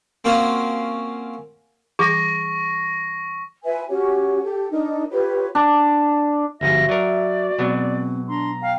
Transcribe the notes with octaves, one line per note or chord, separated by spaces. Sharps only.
A#3 C4 C#4 F4 F#4
E3 G3 G#4 C#6 A#6
F4 B4 E5 G#5
C#4 F#4 G4 C#5
G4 A4
D4 D#4 A#4
F4 G4 B4 C#5
D4
G1 G#2 F3 F#4 E5 A#6
F#3 A#4 D5
B2 F#3 G#3 C4
D4 A#5 C6
F5 G5